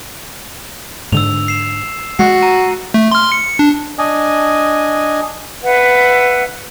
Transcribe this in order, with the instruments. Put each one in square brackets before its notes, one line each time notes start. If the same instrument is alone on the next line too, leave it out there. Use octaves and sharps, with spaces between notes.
[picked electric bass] G#2 D3 [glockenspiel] E6 F7
[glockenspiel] C7 E7
[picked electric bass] G#3 [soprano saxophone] F#4 [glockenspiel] C7
[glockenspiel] A#5 D#7
[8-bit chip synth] A3
C6 F6
C#7
D4
[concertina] D4 D#5 G#5
[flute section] B4 E5 F#5